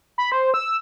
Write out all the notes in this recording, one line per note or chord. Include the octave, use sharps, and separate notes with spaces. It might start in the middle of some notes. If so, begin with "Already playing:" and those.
B5
C5
E6